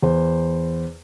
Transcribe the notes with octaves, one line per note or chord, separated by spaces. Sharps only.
E2 C5